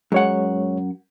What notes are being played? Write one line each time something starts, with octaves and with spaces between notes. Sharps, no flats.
F#2 G#3 C#5 F#5